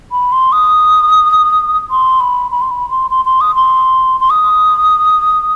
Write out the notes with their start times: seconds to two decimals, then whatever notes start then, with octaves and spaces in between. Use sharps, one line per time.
0.12 B5
0.32 C6
0.52 D#6
1.91 C6
2.20 B5
2.51 B5
2.62 C6
2.71 B5
2.90 C6
3.11 C6
3.25 C6
3.41 D#6
3.55 C6
4.20 C6
4.30 D#6